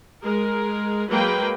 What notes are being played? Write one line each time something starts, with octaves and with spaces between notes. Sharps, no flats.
G#3 A#4
F#3 G#3 A#3 B4 G5